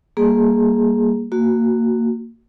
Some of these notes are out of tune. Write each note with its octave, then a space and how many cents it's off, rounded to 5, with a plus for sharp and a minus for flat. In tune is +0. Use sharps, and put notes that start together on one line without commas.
G3 +0 A#3 +0 G#4 +0
A#3 -20 F#4 +0